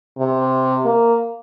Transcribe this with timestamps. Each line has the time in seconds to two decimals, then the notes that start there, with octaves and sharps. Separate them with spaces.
0.18 C3
0.85 A#3